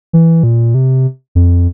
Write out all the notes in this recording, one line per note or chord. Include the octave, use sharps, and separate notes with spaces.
E3
A#2
C3
F2